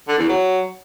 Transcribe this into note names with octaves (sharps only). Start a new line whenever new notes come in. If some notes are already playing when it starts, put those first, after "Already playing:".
D3
E2
F#3